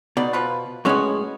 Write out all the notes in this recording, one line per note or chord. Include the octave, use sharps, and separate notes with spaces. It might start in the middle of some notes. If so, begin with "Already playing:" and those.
B2 B3 D#4 D5
F3 F4 B4
A2 G#3 B3 C#4 F#4